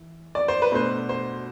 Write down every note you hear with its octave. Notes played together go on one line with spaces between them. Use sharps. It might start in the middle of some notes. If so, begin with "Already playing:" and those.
Already playing: E3
D5
C5
B4
B2 A3 D4 C5
C5